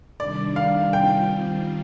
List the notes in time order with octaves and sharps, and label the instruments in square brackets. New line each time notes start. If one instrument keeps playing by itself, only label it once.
[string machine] C3 D#3 G3 D4 [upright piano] D5
[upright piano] F5
[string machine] D#3 G3 C4 F4 [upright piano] G5